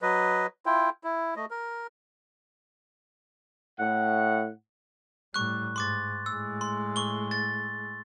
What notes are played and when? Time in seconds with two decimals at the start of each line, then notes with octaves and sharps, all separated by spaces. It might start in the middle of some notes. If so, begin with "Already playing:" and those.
0.02 F#3 B4 D#5
0.66 E4 F4 G5
1.04 E4
1.36 A3 D#5
1.51 A#4
3.79 A2 F#5
5.34 A2 G3 C#6 F#6
5.76 G#2 C6 D6 A6
6.26 A2 G#3 E6
6.61 C6
6.96 C#6 G7
7.31 A6